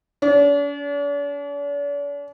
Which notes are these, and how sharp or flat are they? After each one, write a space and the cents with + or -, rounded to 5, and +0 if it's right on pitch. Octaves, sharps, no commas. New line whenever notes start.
D4 -45